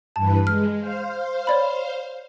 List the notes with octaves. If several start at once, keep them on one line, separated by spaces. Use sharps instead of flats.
G2 E3 B4 A5
G#3 F6
C5 F5
C#5 D5 B5